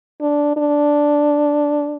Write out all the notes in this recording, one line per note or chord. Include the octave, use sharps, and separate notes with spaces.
D4
D4